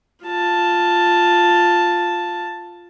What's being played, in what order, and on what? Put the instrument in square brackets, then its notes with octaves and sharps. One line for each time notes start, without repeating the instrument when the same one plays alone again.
[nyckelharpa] F4 A5